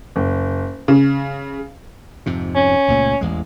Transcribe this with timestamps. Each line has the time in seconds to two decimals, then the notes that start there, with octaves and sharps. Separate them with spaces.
0.16 F#1
0.88 C#3
2.26 F2 G#2 C3
2.56 C#4
2.88 C#2 A#2 A3
3.21 A1 E2 G#3